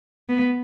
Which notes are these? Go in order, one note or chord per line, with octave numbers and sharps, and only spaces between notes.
B3